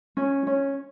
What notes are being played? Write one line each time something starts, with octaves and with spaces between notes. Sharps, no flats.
C#4
C#4